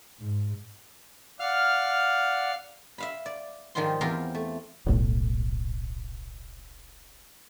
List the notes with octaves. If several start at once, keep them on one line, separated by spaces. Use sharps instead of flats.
G#2
D5 F5 F#5 F6
E5 F5 B5
D5
G#2 D#3 F3 G3 F4 C6
E2 C4 F4 G4 A#4 F5
A3
D#1 B1 A2